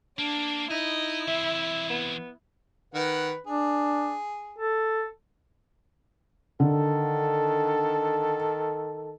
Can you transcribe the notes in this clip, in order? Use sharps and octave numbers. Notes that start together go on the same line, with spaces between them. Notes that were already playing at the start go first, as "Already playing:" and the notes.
A#3 D4
D#4 E4 D#5
E3 C4 E5
B3
D#3 B4 F#5
D4 G#4
A4
D3 D#3 A4